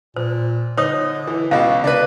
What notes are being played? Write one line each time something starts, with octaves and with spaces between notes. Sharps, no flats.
A#2 C5
D3 D#4 C5 C#5 D#6
E3
C#2 B2 F5
C#3 D4 B4